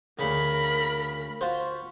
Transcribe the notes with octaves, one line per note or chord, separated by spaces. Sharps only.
D2 C#3 A#4 B5
F4 F#4 C5